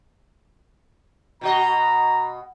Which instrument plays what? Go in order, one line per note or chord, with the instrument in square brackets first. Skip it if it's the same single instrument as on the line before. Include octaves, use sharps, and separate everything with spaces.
[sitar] B2 F#4 D#5 [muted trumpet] A#5